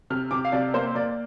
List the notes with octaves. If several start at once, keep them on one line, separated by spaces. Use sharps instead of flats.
C3 F6
C3 D6
F5
C3 D5
A#3 C5
A#3 D5